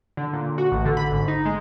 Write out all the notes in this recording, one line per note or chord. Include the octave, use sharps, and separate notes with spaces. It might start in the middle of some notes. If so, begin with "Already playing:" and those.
D3
A#2
F#4
A1
D3
B5
G#1
D#4
G#3